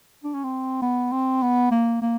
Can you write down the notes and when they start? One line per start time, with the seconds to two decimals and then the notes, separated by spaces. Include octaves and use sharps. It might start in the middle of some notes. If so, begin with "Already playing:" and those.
0.24 D4
0.34 C#4
0.44 C4
0.82 B3
1.12 C4
1.43 B3
1.71 A#3
2.02 A#3